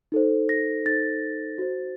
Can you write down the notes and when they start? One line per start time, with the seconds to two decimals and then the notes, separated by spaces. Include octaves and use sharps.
0.12 D#4 A4 C5
0.49 A#6
0.85 D#4 A4 C5 A6
1.58 F#4 C5